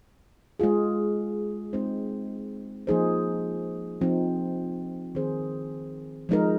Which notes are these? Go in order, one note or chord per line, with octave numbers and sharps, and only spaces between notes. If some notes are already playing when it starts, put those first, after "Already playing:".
G#3 F4 G#4
G#3 C4 D#4 C5
F3 A#3 D#4 G#4 C5
F3 C4 D#4
D#3 C4 G#4 C5
F3 G#3 D#4 A#4